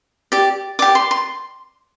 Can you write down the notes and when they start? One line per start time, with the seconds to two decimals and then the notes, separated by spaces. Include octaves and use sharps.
0.32 G4 D5
0.79 G4 D5 D6
0.95 C6
1.11 C6